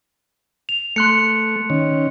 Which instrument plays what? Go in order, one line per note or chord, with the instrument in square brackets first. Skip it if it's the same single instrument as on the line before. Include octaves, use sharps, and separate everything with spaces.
[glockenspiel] F7
[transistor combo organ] A3 [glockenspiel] C6 F#6 C#7
[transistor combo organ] D#3 C#4